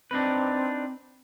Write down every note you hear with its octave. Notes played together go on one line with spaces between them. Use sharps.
C4 D4 D#4 B4